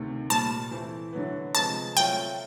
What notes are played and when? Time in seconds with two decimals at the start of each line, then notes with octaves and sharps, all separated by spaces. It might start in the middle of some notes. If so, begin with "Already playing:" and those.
Already playing: D2 C3 D#3
0.30 A#2 G3 C4 A5
0.71 E3 A3 C4 E4
1.13 D3 F#3 B3
1.55 C3 F3 G#3 B3 A5
1.96 F#3 A3 C4 F4 G5